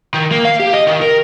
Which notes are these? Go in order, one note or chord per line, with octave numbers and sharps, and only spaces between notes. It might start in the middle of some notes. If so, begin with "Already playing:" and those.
D#3
A#3
F5
G4
D#5
D#3
A#4